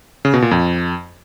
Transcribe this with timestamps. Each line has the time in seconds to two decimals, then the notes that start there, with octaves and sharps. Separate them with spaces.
0.25 C#3
0.34 B2
0.42 A#2
0.51 F2